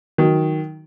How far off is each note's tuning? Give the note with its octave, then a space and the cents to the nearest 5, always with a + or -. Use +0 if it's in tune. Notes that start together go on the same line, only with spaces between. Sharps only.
D#3 +5 F#3 +0